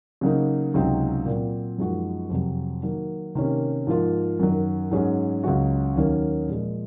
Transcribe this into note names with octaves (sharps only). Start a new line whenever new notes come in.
C#3 F#3 A#3 D#4
C#2 C3 F#3 C4 D#4
A#2 F#3 C4
F#2 F3 G#3 D#4 F#4
F2 C3 F#3
D#3 F#3 A#3
C3 D#3 A#3 C#4
G#2 F3 A#3 F4
F#2 D#3 F#3
G#2 F#3 C#4 G#4
C#2 C#3 F#3 C#4 F#4
D#2 D#3 F#3 A#3 C#4
A#2 F3 G#3